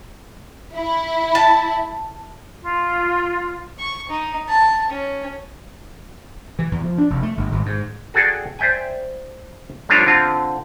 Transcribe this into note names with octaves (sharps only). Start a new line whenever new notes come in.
E4
A5
F4
C#6
D#4
A5
C#4
E3
E2
F3
D4
F1
A3
G1
G#1
G#2
F#4 G#4 A4 D5 G5
C5 D5 E5 G5 G#5
F3 G3 A3 D4 F4 C#5
D3 C4 F4